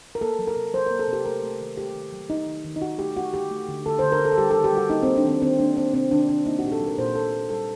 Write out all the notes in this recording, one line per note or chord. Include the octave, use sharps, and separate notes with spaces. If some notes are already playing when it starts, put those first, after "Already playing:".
A#4
A#3 A4
F#3
A#4
C3
F#3 C5
A#3 A#4
A4
C3 G4
A3 A#4
A3
D#3
A3 G4
D#3
F#3
D#3 D#4
D#3
D#3
D#4
D#3 F#4
A3 G4
A3 F#4
D3 G4
A3
D3
D3 A4
D3 C5
A#4
D3 A4
A4
G3 G4
D#3 A4
G4
G3 F#4
A#3 D#4
A#3 C4
D4
D#3 C4
D#3 C4
A#3 D4
A#3 C4
C3 C4
D#3 D4
C3 D4
A#3 D#4
F#4
A#2 G4
A4
F#3
A#4
A#2 C5
A#2 A4
A#3 F#4
G3 A4